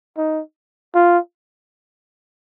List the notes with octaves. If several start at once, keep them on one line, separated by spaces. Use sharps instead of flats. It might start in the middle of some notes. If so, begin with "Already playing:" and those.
D#4
F4